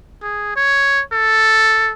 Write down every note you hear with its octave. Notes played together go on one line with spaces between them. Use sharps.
G#4
C#5
A4